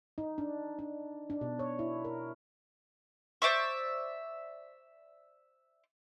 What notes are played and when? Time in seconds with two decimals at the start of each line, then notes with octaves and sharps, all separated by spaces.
0.18 D#4
0.38 D4
0.79 D4
1.30 D4
1.41 B2
1.59 C#5
1.79 E4
2.05 A#4
3.42 C5 D5 E5 C#6